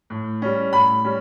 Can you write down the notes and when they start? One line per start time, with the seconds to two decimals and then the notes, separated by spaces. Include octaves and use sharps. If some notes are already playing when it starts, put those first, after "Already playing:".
0.10 A2
0.42 G3 C#4
0.73 A2 B5
1.05 G3 C#4